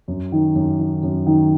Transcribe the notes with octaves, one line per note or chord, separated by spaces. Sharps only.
F#2
D#3
F#2
D#3
F#2
D#3